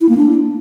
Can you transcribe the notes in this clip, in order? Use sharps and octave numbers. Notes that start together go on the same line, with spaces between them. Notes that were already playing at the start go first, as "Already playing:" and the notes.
E4
A#3
D4